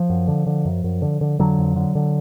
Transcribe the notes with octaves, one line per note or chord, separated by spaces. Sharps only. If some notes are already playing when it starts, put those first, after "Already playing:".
Already playing: F3
F#2
D3
D3
F#2
F#2
D3
D3
F2 D3 F#3
F2
D3
D3